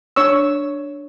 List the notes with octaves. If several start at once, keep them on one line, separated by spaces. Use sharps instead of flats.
D4 C#5 C#6 E6